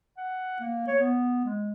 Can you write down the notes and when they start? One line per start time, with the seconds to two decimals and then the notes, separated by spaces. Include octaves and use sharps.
0.17 F#5
0.60 A#3
0.87 C#5
0.99 B3
1.45 G#3